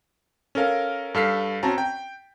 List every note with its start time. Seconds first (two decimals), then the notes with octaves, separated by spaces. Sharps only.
0.55 C#4 A4 A#4 F5
1.14 G2 A4 F5 F6 B6 C7
1.63 C4 C#4 F#4 A5 A#5
1.78 G5